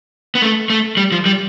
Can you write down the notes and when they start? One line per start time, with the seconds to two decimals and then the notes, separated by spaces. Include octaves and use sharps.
0.35 B3
0.42 A3
0.70 A3
0.97 G3
1.12 F3
1.26 G3